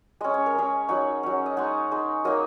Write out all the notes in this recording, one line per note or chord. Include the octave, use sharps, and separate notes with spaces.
G#3 C#4 D#5
C#5
A#4
G#3 C#4 G#4 C#5
F#3 D#4 C#5 F#5
F#3 C#4
D#5
G#3 D#4 C#5 F#5
G#3 D#4
F#3 A#3 D#4 A#4 D#5